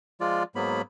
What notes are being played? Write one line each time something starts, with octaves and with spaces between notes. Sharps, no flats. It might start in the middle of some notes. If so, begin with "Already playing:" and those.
F3 G#3 F4 D5
G#2 F#3 A#3 B3 B5